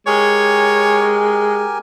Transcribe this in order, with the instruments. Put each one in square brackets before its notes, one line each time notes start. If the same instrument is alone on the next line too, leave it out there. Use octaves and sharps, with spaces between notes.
[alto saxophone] G#3 [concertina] G4 A#4 G#5 [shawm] C#5